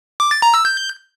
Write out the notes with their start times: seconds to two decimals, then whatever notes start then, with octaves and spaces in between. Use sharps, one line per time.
0.20 D6
0.31 A6
0.42 A#5
0.54 E6
0.65 G6